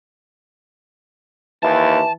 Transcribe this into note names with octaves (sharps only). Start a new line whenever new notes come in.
D#2 E3 A5